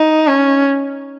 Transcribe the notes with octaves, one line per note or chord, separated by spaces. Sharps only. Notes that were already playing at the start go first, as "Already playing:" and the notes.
Already playing: D#4
C#4